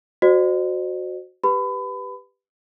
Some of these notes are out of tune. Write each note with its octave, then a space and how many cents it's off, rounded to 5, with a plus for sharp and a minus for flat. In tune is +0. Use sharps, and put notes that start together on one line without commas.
F#4 -10 C5 +0 D#5 -45
G4 +0 B4 +0 B5 +30